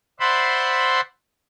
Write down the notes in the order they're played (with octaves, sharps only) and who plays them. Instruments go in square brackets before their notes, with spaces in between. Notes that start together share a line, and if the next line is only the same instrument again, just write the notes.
[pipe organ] C5 D5 E5 F#5 B5 C6